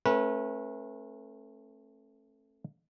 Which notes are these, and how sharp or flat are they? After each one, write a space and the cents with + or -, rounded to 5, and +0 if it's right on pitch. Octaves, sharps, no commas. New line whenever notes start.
A3 +0 C#4 -40 B4 -35